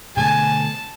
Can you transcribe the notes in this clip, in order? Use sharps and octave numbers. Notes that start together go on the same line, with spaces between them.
B2 D3 A3 G#5 A5